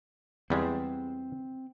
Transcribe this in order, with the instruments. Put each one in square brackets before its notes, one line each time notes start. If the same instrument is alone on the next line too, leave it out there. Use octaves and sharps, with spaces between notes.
[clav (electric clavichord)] E2 G3 G#3 [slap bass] C4